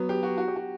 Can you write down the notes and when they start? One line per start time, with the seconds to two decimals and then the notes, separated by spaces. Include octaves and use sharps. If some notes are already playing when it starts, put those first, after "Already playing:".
Already playing: F#3 B3
0.09 G4
0.23 F#4
0.38 F#4
0.48 G4
0.56 F#4